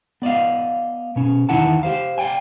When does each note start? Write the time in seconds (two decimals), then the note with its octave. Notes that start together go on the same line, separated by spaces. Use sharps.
0.22 B3 D5 D#5 F5
1.16 B2 C#4
1.49 E2 D#3 E4 F#5 A5
1.83 G4 C5 F5
2.18 D5 F5 G5 G#5